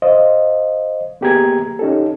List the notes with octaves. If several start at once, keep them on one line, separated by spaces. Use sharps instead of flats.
C5 D#5 F5
A#3 B3 G4 G#4 A#5 G#6
C#4 D#4 G4 A4